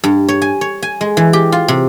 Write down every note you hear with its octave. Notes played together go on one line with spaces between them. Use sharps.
G2
C#5
G#5
C#5
G#5
G#3
E3
G4
F4
C3